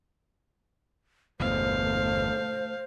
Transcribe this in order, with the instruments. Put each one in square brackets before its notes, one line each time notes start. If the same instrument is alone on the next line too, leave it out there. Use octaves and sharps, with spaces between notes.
[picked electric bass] G1 E2 B2 [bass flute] A3 [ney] C5 [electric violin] F5